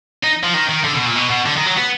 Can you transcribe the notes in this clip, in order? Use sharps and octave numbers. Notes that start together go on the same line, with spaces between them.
D#4
F3
D#3
D#3
D3
B2
A#2
B2
B2
D3
D#3
F#3
B3